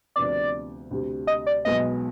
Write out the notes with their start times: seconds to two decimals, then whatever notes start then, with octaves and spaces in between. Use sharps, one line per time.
0.16 D2 C3 F3 B3 D5
0.91 D2 C3 G3
1.27 D#5
1.46 D5
1.65 B1 B2 G#3 B3 D#5